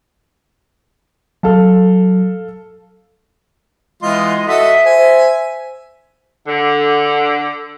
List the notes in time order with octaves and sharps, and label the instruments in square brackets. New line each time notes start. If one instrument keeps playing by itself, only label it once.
[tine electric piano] F#3 [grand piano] A4 F5 A5
[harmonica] E3 F4 C6 [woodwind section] G#3 B3 D#5
[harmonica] F#4 A4 D#5 [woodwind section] E5
[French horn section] C5 [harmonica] G#5
[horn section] D3